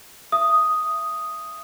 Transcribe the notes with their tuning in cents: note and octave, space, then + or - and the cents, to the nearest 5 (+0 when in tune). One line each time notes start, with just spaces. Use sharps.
E5 +35 D#6 +0